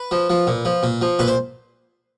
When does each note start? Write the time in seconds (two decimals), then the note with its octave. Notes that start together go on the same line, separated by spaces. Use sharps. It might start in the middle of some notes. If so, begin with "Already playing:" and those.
Already playing: B4
0.11 F3
0.30 F3
0.47 A#2
0.65 F3
0.83 A#2
1.01 F3
1.19 A#2 B4
1.27 C5